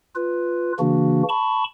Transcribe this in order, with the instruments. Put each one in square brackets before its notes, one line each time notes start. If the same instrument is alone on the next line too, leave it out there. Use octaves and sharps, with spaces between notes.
[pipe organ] F4 B4
C#3 E3 A#3 D4 F#4
A5 B5 C#6